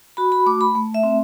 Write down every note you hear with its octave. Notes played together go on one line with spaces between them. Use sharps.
F#4 B5
B5
A3 D6
B5
A3
E5
C4